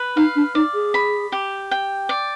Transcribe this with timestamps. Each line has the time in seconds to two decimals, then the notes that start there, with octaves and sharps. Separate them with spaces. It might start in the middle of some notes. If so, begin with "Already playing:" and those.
Already playing: B4
0.16 D#4 F5
0.36 D4
0.55 D#4 D5
0.75 G#4
0.94 B5
1.32 G4
1.71 G5
2.09 D5